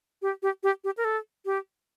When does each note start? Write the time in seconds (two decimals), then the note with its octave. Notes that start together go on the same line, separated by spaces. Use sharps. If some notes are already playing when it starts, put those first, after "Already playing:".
0.22 G4
0.42 G4
0.63 G4
0.84 G4
0.97 A#4
1.04 A4
1.45 G4